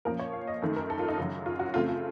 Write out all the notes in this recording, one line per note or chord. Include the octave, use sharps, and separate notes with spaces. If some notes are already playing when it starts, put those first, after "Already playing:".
A#2 F3 A#3 C#4 A#4
C#5
F5
D#5
F#2 D#3 A3
A#4
A4
F4
D#4
F#2 C#3 F#3
F4
F#4
C#3 A3 C4 F4
F4